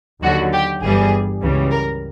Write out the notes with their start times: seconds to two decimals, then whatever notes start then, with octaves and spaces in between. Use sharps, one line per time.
0.22 D#2 D3 F#3 F#4
0.52 G4
0.82 G1 G2 E3 G3 G#4
1.41 C#2 C#3 E3 G3
1.71 A#4